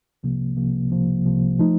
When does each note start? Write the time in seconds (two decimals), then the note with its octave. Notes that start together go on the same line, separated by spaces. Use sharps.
0.23 C2 C3 F3 A#3
0.57 C2 C3 F3 A#3
0.90 C2 C3 F3 A#3
1.25 C2 C3 F3 A#3
1.59 F3 A3 D#4